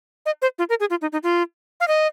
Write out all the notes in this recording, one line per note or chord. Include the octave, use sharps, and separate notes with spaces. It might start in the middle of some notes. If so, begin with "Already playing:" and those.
D#5
C5
F4
A#4
G#4
F4
D#4
D#4
F4
F5
D#5